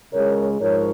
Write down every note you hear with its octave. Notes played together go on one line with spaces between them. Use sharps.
C#2 C#3 G#3 A#4 C#5
G#2 F3 A#4 C#5